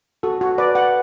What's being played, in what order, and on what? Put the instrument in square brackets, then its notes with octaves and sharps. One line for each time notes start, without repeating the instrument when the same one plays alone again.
[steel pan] F#4 [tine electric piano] A4
[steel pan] F#4
[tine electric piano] B4 [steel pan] D5
[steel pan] F#5